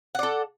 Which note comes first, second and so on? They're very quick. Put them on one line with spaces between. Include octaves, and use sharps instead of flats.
F#5 D5 A4